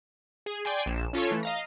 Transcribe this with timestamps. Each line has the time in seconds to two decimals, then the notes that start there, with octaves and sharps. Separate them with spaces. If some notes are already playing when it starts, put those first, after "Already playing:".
0.46 G#4
0.65 D5 G5 G#5 C6
0.86 A#1 E7
1.13 C#4 F4 A4 C#5
1.31 E3 A3
1.43 D#5 F5 A#5